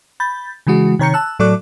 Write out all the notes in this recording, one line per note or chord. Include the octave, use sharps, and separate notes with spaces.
B5 G6 A6
C#3 E3 G#3 F#4
C3 D#3 C#5 A#5 G6 C#7
A5 E6 F#6
A2 F#3 A4 D5 D6 F#6